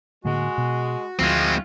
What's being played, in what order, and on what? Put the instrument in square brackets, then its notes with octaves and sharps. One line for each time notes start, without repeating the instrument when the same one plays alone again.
[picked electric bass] A2 D3 A#3 [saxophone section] G#3 [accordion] F#4
[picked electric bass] B2
[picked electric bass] D2 F3 [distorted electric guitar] G#3 C4 [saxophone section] E4 F4